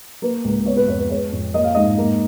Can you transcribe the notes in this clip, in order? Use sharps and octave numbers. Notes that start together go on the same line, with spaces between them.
A#3 B4
C#2
B3 C#5
B4
F2 C#5
B4
G#3 C#5
F2
A#3 D#5
F5
G#2 D#5
A#3